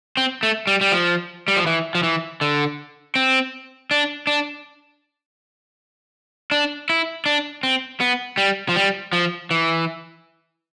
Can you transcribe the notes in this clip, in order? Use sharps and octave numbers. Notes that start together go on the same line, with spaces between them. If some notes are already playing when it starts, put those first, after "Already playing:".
C4
A3
G3
G3
F3
G3
F3
E3
F3
E3
D3
C4
D4
D4
D4
E4
D4
C4
B3
G3
F3
G3
F3
E3